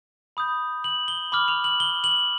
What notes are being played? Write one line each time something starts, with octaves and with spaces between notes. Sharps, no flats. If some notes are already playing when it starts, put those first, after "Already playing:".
B5 D#6 G6
F#7
G7
B5 D6 F6 F#7
F7
F#7
G7
F#7